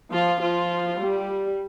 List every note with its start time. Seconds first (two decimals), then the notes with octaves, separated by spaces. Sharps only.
0.12 F3 F4
0.41 F3 F4
1.00 G3